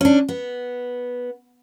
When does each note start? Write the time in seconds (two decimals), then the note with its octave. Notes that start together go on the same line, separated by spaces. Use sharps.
0.01 C#4 D4
0.29 B3